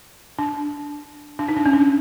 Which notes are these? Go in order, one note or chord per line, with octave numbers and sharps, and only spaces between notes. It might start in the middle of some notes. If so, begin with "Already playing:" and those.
D4
D4
D#4
D4
C#4
D4